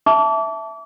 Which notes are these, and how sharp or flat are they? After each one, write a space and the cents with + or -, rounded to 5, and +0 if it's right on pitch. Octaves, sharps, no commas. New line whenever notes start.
E5 +0 A5 +0 D6 -35